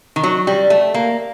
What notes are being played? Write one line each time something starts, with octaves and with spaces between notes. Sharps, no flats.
D#3
F#3
G3
A3
A#3